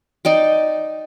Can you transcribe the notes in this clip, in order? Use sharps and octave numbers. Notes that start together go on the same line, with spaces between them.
D#4 D5 G5